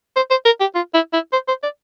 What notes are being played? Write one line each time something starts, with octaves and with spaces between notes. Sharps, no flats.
C5
C5
A#4
G4
F4
E4
E4
C5
C5
D5